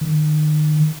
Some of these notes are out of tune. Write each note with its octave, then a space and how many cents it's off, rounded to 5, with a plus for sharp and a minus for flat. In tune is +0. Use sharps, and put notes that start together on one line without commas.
D#3 -35